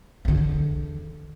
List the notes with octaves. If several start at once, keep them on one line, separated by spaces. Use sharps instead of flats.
E2 D3